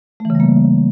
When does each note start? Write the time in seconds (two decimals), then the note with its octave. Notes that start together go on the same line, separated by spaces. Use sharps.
0.20 A3
0.25 E3
0.30 C#3
0.35 G3
0.40 A#3